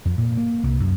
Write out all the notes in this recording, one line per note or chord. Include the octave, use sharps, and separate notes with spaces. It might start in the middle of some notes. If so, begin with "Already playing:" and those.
F2
A#2
A#3
C2
F#2